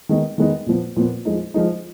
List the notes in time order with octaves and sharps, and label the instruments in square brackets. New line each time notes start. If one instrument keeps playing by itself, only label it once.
[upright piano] D#3 G#3 B3 D#4
D#3 G#3 B3 D#4
A#2 F3 B3
A#2 F3 B3
F3 G#3 D#4
F3 G#3 D#4